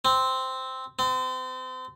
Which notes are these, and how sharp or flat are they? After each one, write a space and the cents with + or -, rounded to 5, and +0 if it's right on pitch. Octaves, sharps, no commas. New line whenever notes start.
C4 -5
C4 -35